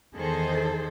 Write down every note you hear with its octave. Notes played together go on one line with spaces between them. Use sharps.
E2 D#3 G#4 A4 C5